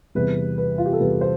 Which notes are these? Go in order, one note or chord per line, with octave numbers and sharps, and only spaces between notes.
E2 C3 G3 B3 B4
B4
F4
G4
A4
E2 C3 G3 B3 B4
C5